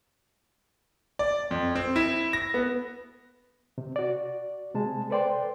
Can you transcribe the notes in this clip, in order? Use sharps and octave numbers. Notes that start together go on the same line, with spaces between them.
D5
F2
C4
E4
A#6
B3
C3
F#4 D5
C3 G#3 A5
A4 B4 C5 D5 G5 C6